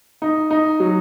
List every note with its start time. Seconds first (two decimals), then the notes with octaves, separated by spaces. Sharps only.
0.22 D#4
0.51 D#4
0.80 F#3